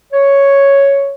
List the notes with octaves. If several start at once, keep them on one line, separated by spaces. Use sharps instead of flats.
C#5